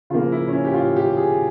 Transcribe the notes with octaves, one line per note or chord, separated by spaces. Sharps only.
C#3 F3 A#3 F4
E4
C#4
E4
G4
F4
G4
G#4